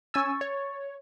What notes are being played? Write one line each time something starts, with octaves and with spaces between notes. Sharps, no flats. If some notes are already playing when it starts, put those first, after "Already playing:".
C#4 G#5 C#6 E6 A6
C#5